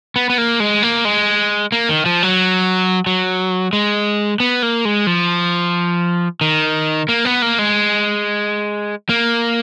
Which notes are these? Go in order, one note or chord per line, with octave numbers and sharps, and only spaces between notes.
B3
B3
A#3
G#3
A#3
G#3
A#3
D#3
F3
F#3
F#3
G#3
B3
A#3
G#3
F3
D#3
A#3
B3
A#3
G#3
A#3